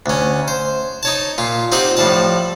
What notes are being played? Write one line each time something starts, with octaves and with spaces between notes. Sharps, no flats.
D2 C#4
C5
D#4 C#5 A5
A#2 F4
C4 D#4 F4 G4 F#5
A2 F3 G3 A5